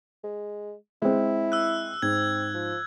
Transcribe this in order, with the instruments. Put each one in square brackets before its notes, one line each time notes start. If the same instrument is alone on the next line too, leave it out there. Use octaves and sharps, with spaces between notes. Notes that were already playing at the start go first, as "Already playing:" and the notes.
[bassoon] G#3
[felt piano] G#3 C4 [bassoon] E4
[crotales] E6 F#6
[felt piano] G#2 [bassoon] C4 [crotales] G#6
[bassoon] F3